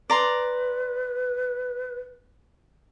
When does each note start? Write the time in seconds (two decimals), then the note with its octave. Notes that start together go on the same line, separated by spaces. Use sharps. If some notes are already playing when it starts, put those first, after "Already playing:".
0.10 B4 D5 A#5 C6